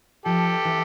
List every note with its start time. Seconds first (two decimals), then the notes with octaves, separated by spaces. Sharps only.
0.26 F3 G4 A4
0.65 E3